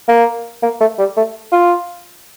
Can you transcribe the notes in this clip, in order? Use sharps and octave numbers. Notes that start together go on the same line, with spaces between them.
A#3
A#3
A3
G3
A3
F4